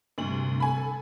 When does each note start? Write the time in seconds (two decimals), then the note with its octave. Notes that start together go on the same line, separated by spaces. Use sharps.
0.18 D2 G2 C3 F#7
0.60 A4 G#5 B5